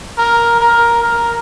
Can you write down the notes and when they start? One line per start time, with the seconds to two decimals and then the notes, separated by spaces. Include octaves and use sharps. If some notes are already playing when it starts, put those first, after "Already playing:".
0.18 A#4
0.61 A#4
1.04 A#4